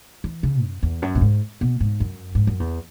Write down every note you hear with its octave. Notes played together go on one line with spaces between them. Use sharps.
E3
C#3
F#2
E2
F#2
B2
G#2
B2
G#2
F#2
G#2
F#2
E2